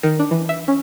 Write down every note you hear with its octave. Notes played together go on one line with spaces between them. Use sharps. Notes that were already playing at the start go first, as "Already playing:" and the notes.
D#3
D4
E3
E5
C#4